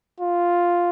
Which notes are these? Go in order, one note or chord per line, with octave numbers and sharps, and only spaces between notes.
F4